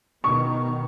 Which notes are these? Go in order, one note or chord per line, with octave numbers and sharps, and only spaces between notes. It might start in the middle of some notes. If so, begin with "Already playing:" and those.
B2 D#3 B3 C#6